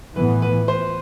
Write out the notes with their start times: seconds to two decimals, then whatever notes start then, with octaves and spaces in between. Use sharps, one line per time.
0.16 A2 E3 B3 B4
0.42 B4
0.68 C5